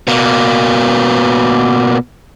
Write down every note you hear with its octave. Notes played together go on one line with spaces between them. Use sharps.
B2 A#3